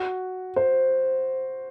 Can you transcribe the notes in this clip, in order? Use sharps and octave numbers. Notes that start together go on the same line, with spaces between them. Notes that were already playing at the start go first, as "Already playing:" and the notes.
Already playing: F#4
C5